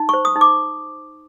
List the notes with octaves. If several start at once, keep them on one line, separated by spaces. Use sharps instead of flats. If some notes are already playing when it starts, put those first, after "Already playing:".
Already playing: D#4
C5 C#6
D#6
D#4
D6